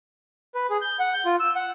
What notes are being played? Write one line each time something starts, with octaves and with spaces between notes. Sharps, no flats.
B4
G#4
G6
F#5
G6
F4
E6
F#5